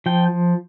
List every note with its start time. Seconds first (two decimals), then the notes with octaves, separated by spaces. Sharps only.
0.06 F3 G5